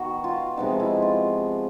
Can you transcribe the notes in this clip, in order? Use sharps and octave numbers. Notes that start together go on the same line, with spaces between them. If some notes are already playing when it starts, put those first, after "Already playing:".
Already playing: D#3 B3 F#4
F4
C3 F3 G#3 B3 D#4
E4
F4